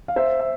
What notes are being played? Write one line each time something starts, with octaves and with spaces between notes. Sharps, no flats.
F5
C5 E5
E5